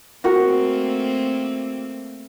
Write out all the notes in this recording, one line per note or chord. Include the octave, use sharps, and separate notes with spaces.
A3 A#3 C4 F#4 A#4 F#5